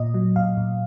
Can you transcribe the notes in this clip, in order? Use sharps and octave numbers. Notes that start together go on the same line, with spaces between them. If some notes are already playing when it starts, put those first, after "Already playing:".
Already playing: A#2 D#5
F#3
A#2 F5
A#2